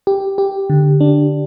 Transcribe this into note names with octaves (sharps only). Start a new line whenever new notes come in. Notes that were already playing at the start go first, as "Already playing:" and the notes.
G4
G4
D3
D4